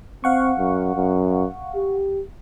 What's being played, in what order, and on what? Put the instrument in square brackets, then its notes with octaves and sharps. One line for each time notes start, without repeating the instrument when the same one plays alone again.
[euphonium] C4 [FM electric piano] F5 F#5 C#6
[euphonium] F#2
F#2
G4